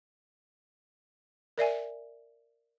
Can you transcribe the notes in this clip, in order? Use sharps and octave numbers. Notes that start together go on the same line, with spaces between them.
A#4 D5 E5 G#5